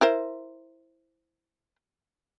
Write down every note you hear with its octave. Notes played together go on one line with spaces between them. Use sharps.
E4 A#4 C5